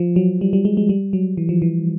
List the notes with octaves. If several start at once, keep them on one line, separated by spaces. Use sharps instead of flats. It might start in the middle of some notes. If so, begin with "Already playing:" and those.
Already playing: F3
F#3
G3
G3
G#3
G#3
G3
F#3
E3
F3
E3